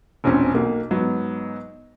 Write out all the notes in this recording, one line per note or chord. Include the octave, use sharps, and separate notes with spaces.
E1 A#1 C4 C#4
B1 A#3
G#2 F#3 B3